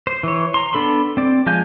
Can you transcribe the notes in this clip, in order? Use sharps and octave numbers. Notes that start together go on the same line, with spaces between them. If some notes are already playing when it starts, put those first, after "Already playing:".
C5
E3 C#5
A#5 C6
B3 D4 A4 B5 C6
C4 D5
F3 G#3 F5 G#5 G6